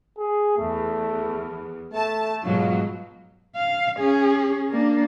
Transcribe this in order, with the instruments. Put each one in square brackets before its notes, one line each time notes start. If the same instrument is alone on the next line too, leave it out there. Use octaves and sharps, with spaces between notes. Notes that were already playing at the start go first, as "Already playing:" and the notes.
[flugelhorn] G#4
[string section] E2 [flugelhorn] A3
[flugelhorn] A3 [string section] A5
[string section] G#2 B2 F#3 [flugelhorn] F4
[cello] F5
C#4 G#4
A#3 D4